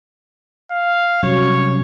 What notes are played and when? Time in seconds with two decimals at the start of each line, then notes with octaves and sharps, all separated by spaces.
0.71 F5
1.23 C3 F#3 G3 C#4 C#5